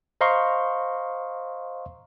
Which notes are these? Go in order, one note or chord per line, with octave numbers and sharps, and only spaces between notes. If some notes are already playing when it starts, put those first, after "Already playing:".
C5 D#5 F5 A#5 C6 C#6